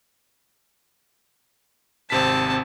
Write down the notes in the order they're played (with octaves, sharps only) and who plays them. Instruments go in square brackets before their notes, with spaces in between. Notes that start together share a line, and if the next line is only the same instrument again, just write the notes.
[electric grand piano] G#1 C3 B6 [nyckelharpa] C4 A5